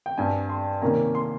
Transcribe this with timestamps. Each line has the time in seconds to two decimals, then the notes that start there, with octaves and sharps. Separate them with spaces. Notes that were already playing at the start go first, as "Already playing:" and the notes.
0.06 G5
0.17 G2 G3 C4 G#5
0.49 C6
0.82 C3 D#3 A#3 C#4 A#5
1.15 C6